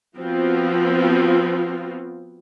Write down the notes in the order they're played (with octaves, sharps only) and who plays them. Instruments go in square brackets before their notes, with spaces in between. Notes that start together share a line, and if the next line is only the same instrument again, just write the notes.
[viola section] F3 B3 C4 F4 F#4